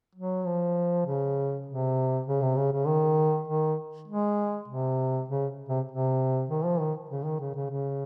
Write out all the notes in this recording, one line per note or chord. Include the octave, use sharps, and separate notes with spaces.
F#3
F3
C#3
C3
C#3
C3
C#3
C#3
D#3
D#3
G#3
C3
C#3
C3
C3
D#3
F3
D#3
C#3
D#3
C#3
C#3
C#3